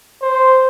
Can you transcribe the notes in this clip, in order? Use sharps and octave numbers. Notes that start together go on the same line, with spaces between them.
C5